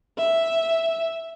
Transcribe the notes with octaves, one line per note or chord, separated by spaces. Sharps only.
E5